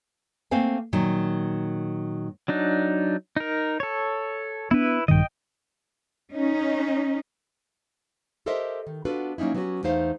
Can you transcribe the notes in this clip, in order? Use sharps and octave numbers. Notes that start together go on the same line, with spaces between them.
A3 A#3 C4 F5 G#5
A#2 D#3 F#3
F#3 D4 D#4
D#4 A#4
A4 C#5
B3 D4 E4 B4
A#1 G2 D#3 D#5 G5
C#4 D#4
G4 A4 A#4 C5 D#5 E5
D#3
B3 D4 F4 F#4 A4 B4
F#3 A#3 C#4 D#4 E4
F#3 B3 C#4 D4 F#4 G4
E2 A3 D#4 C5 F5